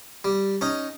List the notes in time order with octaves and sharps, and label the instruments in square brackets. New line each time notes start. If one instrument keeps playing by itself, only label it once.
[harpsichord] G3
C#4 D#4